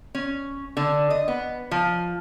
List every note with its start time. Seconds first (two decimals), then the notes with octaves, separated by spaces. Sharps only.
0.15 C#4
0.77 D3
1.10 D#5
1.28 B3
1.71 F3